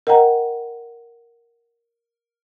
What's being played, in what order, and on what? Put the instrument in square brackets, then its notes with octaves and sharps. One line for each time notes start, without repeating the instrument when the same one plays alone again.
[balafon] A#4 D#5 F#5 G5 A#5